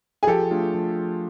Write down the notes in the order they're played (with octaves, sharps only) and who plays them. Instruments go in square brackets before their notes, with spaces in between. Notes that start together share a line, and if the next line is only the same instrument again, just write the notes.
[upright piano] G#4
[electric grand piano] F3 [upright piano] G4 A4
[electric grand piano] A3 D4 F4 G#4
F3